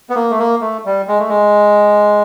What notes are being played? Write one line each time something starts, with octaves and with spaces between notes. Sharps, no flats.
B3
A#3
A3
A#3
A3
G3
G#3
A3
G#3